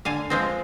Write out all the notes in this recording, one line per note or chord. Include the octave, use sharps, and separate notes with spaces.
D3 F5 G#5
F3 G#3 C4